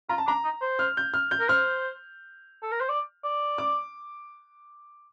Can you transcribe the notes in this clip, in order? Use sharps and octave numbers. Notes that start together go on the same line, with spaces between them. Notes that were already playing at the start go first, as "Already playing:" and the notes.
F4 A#5
A5
D4 A#5
D#4
C5
F6
G6
F6
G6
A#4
C5 F6
A4
A#4
C5
D5
D5
D6